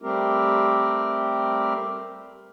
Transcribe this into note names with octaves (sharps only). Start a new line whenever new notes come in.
G3 A3 C4 G4 A#4